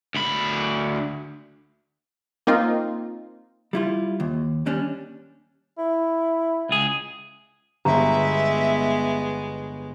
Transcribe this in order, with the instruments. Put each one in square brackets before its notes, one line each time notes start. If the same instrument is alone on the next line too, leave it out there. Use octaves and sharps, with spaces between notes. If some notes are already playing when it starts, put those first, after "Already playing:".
[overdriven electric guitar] D2 B5
[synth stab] A#3 C4 D#4 F4
[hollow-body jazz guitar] G3 E4 F4
D#2
D#2 G3 C#4 D4
[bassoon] E4
[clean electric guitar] C#2 G#4
[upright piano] G1 [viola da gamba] G#3 B3 [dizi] E5 [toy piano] A#5